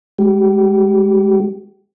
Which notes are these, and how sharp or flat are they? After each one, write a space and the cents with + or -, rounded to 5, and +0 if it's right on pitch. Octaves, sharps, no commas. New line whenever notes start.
G#3 +0 G4 -30